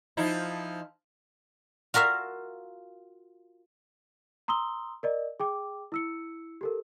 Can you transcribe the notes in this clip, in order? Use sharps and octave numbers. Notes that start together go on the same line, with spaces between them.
F3 D#4 E4
F4 F#4 A#4 E5 F5
A#5 C6 D#6 E6 G7
A#4 D5 D#5
G#4 G5 D6
E4 E6 C#7
G4 A4 A#4